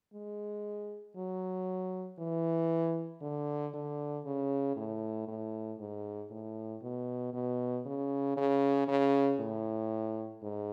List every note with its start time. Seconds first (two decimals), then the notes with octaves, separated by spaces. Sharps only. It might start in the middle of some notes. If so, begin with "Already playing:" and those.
0.14 G#3
1.16 F#3
2.19 E3
3.22 D3
3.74 D3
4.25 C#3
4.76 A2
5.28 A2
5.79 G#2
6.31 A2
6.82 B2
7.33 B2
7.86 C#3
8.37 C#3
8.88 C#3
9.40 A2
10.43 G#2